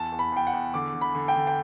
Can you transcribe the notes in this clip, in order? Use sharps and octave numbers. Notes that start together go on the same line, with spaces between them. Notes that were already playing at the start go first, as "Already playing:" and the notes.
Already playing: E2 A5
E2
B5
E2 G5
F#5
E2
D3 D6
D3
B5
D3
G5
D3
G5